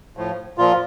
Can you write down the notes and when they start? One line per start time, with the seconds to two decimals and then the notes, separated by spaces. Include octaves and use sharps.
0.17 A2 F3
0.58 A#2 F3 F4